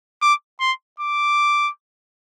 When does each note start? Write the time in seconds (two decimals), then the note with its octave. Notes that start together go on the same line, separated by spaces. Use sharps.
0.22 D6
0.60 C6
1.00 D6